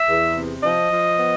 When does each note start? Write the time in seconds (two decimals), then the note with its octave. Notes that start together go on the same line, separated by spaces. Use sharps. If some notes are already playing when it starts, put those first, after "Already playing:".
Already playing: E5
0.08 E2
0.36 C3
0.63 F3 D#5
0.91 F3
1.19 B3